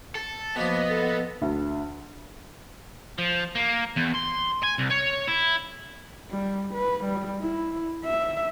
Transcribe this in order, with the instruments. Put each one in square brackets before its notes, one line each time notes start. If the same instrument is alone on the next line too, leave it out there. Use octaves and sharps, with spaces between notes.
[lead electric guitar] A4
[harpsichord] B2 F3 [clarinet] A#3 [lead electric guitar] B3 [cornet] D#5
[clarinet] A4
[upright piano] D2
[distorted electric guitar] F3
A#3
E2
C6
G#5
C2
C#5
E4
[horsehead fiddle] G3
B4
G3
E4
E5